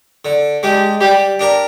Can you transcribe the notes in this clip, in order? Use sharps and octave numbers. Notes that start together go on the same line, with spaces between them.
D3
G#3 D4 G4
G3 G4
D4 G4 A#4